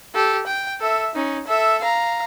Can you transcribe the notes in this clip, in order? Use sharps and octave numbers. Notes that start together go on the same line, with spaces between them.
G4 A4
G5
A4 E5
C#4 D#4
A4 E5
F5 A#5